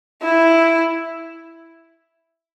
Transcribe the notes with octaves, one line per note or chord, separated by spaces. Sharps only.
E4